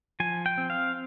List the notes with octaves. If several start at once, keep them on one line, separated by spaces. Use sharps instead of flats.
F3 G#5
G5
C4
F5